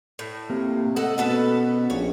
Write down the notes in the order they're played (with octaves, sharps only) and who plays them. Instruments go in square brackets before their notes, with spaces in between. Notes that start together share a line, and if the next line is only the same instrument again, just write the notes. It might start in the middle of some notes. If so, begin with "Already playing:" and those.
[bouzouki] A2
[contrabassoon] C3 [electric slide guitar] A#3
[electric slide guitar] A3 [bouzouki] A4 D#5 F#5
[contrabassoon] B2 [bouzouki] B3 A4 B4 [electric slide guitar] C#4 F#4 C5
[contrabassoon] A#1 [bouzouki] C#5